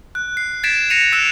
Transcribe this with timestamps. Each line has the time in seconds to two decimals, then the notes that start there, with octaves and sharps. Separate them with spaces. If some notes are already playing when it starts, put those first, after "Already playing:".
0.15 F#6
0.37 C7
0.64 G#6 A6 B6 C7 D7 E7
0.90 A#6 C7 C#7 D#7 F7
1.12 E6 F#6 D7 E7